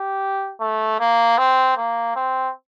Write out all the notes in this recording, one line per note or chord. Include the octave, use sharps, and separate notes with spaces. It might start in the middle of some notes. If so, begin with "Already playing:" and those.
Already playing: G4
A3
A#3
C4
A#3
C4